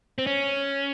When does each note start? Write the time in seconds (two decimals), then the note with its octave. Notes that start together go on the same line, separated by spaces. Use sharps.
0.18 C4
0.27 C#4